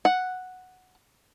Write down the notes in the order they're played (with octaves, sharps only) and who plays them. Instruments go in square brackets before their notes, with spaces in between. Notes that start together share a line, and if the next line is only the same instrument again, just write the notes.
[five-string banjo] F#5